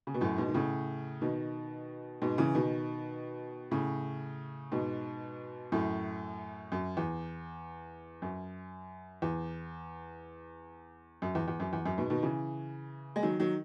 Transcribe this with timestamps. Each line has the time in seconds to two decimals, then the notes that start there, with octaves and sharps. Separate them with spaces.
0.07 C#3
0.14 B2
0.21 F#2 A2
0.38 G#2 B2
0.48 D#3
0.54 A2 C#3
1.22 B2 D#3
2.22 G#2 B2
2.38 C#3 E3
2.55 B2 D#3
3.71 A2 C#3
4.72 G#2 B2
5.72 F#2 A2
6.72 F#2
6.97 E2
8.22 F#2
9.22 E2
11.22 F#2
11.35 E2
11.48 E2
11.60 F#2
11.73 E2
11.86 F#2
11.98 G#2 B2
12.10 B2 D#3
12.23 C#3 E3
13.16 G#3
13.23 D#3 F#3
13.39 D#3 F#3